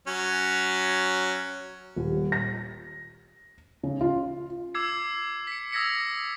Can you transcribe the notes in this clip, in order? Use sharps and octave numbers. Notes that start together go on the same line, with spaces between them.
F#3 C#4
D#1
A#6
C#3
F4
D6 E6 G#6 C7
B6 C#7
D#6 E6 G#6 A#6 B6 C#7